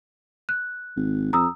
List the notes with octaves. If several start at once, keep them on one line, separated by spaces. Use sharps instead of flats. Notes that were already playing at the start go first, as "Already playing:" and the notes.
F#6
G#1
F2 A#5 D#6 E6